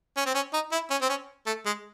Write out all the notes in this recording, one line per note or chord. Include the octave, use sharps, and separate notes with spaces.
C#4
C4
C#4
D#4
E4
C#4
C4
C#4
A3
G#3